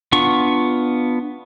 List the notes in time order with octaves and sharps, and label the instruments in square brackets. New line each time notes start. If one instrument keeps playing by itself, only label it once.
[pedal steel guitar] B3 D4 F4 C#6